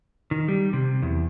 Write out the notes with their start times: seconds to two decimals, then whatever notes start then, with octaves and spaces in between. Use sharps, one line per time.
0.31 D#3
0.48 G3
0.73 C3
1.02 E2